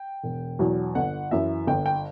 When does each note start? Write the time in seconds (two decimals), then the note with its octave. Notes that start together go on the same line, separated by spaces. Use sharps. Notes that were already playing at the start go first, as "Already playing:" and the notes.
Already playing: G5
0.23 E1
0.59 E2 B2 F#3
0.95 G1 F#5
1.31 F#2 E3 E5
1.67 G1 G5
1.86 G5